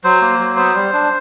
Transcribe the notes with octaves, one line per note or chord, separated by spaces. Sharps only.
F#3 C5
A#3
F#3
B3 C5
G3
D4